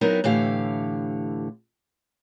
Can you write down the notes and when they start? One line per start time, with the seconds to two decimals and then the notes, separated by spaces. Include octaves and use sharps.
0.01 F#3 B3 C4 D#4 E4 A#4
0.24 A2 D3 E3 G4 F5